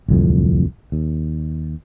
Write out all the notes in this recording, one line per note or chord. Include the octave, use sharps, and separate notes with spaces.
D1 C2 F2
D#2